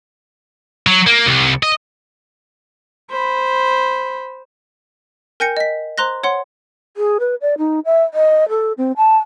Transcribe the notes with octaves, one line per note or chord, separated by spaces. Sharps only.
F#3
A#3
C2
D#5
C5 B5
A#4 G5 G#5 G6 A#6 C#7
D#5 B6
C5 A#5 C6 F#6 A#6
C#5 F#5 C6
G#4
B4
D5
D#4
E5
D#5
A4
C4
A5